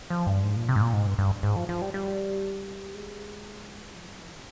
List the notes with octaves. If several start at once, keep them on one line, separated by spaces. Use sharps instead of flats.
F3
G2
G#2
A#2
C3
G#2
A#2
G#2
G2
G2
G#2
F3
F3
G3
G3
G#3
F3
G3
F3
D#3